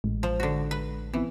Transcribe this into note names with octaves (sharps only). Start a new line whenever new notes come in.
A1 G#3
F3
D3 F#4
B4
E3 B3 C4 E4